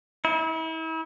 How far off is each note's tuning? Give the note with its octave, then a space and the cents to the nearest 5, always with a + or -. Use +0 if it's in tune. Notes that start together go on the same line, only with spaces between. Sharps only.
E4 -35